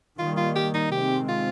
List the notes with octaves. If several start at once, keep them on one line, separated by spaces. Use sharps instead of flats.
D#3 G3 A#3 F4
F4
G4
D#4
C3 D#3 G#3 C4 G4
F4